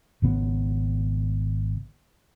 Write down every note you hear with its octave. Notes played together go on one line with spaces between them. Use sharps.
G#1 C#3 B3 C#4